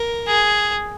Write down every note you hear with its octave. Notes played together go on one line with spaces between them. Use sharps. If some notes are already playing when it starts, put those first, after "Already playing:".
Already playing: A#4
G#4